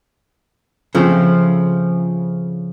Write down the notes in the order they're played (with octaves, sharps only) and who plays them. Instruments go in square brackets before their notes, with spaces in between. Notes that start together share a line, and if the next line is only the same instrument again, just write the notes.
[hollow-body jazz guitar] C#3 F3 A3 C4